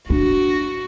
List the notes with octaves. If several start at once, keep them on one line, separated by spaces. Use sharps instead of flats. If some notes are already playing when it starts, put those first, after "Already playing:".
D4 F#4